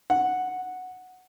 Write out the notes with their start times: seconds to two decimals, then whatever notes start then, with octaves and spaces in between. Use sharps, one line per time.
0.10 F#5